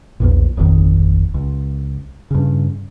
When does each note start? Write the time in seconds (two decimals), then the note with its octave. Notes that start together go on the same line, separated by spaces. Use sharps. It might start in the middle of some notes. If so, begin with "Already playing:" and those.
0.20 A#1 E2 A#2
0.57 D1 G#1 F2 D#3
1.34 C#2
2.31 G2 C#3